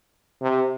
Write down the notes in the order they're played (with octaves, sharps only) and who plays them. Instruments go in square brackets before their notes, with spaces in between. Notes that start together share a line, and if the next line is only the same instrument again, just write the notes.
[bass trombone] C3